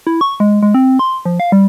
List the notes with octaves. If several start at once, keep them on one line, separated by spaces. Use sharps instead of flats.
E4
C#6
G#3
G#3
C4
C6
F3
F5
G3